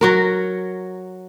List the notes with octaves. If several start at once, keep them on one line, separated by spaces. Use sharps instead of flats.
F#3 F#4 A#4